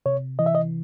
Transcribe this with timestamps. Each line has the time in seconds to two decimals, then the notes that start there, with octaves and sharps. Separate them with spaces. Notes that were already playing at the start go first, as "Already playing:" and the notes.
0.06 C3 C#5
0.39 E3 D#5
0.46 E5
0.55 D#5